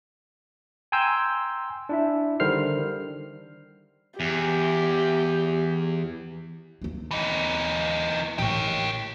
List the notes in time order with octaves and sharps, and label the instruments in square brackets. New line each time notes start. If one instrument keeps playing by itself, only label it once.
[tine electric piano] G5 G#5 A#5 C6 E6 G6
D4 E4 E5
D3 D#3 G3 C5 F6 C7
[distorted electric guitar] E2 [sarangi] G4
[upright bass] D#2 A#3
[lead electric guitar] E3 D#4
[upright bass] A1 [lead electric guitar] G4 C#5